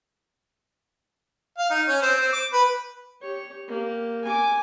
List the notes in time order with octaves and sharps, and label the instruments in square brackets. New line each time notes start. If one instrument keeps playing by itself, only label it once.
[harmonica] F5
D#4
C#4
C4
C4
D6
B4
[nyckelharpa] G4 C#5
A#3 G4
G#5 D6